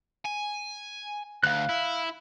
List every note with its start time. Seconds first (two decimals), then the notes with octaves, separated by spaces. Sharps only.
0.25 G#5
1.44 D2 F5 F#6
1.69 E4